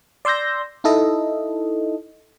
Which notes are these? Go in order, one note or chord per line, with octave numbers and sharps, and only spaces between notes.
D5 C6 E6 G6 A#6
D#4 E4 A4 D#5